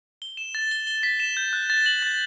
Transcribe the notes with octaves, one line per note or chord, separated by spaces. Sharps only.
G7
E7
A6
G7
G7
B6
E7
G6
F#6
A6
F#7
A6